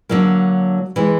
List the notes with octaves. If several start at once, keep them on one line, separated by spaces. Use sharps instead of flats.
D3 F#3 A#3
E3 G#3